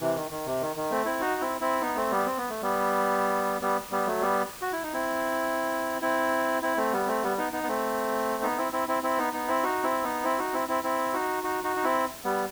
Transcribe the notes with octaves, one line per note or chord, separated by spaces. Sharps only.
C3 E3
D#3
D#3
C3
D#3
D#3
A3 C4
C4 E4
D#4 F#4
C4 E4
C4 E4
B3 D#4
A3 C4
G3 B3
C4
B3
A3
G3 B3
G3 B3
G3 B3
F#3 A3
G3 B3
F#4
E4
D#4
C4 E4
C4 E4
C4 E4
A3 C4
G3 B3
A3 C4
G3 B3
B3 D#4
B3 D#4
B3
A3 C4
B3 D#4
C4 E4
C4 E4
C4 E4
C4 E4
B3 D#4
B3 D#4
C4 E4
D#4 F#4
C4 E4
B3 D#4
C4 E4
D#4 F#4
C4 E4
C4 E4
C4 E4
D#4 F#4
D#4 F#4
D#4 F#4
D#4
C4 E4
G3 B3